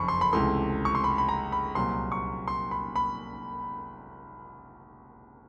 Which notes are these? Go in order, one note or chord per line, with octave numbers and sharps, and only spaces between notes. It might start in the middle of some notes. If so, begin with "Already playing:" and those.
Already playing: F#1 F2 B5 C#6
C6
B5
C#2 C3 E3 A3 C6
C#6
C6
B5
B5
A#5
B5
C2 A#2 F#3 C6
C#6
C6
B5
B5